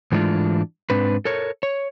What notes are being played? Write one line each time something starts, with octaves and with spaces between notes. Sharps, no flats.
G#2 E3 G#3 A3 D4 F4
G#2 C4 D4 B4
A4 A#4 C#5
C#5